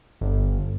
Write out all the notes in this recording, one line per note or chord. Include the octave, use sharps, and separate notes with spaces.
G1